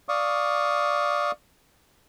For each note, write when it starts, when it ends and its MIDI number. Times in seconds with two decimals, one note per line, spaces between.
0.09 1.31 74
0.09 1.31 77
0.09 1.31 85
0.09 1.31 87